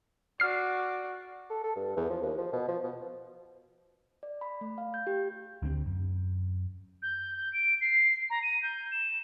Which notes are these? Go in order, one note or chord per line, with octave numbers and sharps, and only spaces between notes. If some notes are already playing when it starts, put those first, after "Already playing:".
F#4 D5 F6 C7
A4
A4
G2
E2
F3
D#2
F3
B2
F3
B2
D5
B5
A3
F5
G6
G4
D2 D3 F3 C4
F#2
G6
G6
D7
C7
A#5
D#7
G6
E7